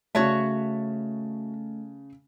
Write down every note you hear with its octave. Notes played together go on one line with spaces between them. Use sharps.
C#3 A3 F#4 C#5 E5 A5